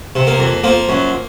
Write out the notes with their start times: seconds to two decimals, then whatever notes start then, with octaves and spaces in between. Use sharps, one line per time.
0.15 C3
0.27 A#3
0.39 F2
0.64 F3 A#3
0.89 F#2